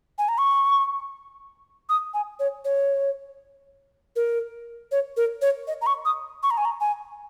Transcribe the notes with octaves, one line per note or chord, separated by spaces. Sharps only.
G#5
A#5
C#6
D#6
G#5
C#5
C#5
A#4
C#5
A#4
C#5
D#5
A#5
C#6
D#6
C#6
A#5
G#5
A#5
G#5